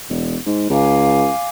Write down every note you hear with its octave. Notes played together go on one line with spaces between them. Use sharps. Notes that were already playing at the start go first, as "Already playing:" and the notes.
E1
G#2
C#2 F5 G#5 D6